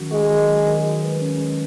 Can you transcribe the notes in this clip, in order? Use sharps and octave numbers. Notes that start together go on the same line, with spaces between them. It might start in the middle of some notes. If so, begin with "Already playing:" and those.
Already playing: D#3 F#3 C#4 F#4
G#3 F#4
D#3
F#3
D#3
G#3
B4
C#4
G#3